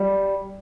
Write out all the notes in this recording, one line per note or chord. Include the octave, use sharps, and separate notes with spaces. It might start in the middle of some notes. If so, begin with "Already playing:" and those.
Already playing: G3